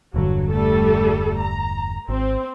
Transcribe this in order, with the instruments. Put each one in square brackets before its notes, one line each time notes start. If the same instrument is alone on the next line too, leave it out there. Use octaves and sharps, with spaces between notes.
[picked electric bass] E1 G2 D3 [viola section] F#3
[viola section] G3 A3 A4
A#5
[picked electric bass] G#1 [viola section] C4